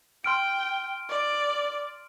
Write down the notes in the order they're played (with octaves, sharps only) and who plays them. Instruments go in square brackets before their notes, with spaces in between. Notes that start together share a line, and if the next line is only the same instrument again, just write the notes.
[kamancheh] G5 [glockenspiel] C6 F6 D7
[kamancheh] D5